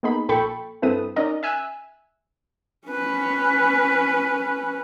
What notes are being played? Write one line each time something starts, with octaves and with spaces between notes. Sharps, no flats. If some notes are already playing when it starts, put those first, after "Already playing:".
A#3 B3 D#4 G#4 B5
A#1 A#2 A4 G5 B5 C#6
G2 C4 E4 A4 B4 D#6
C#4 D#4 A#4 D5 D#5 A#5
E5 G#5 E6 F#6
C#4 B4